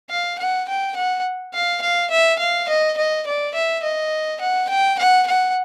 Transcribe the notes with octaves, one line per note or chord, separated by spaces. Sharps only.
F5
F#5
G5
F#5
F5
F5
E5
F5
D#5
D#5
D5
E5
D#5
F#5
G5
F#5
F#5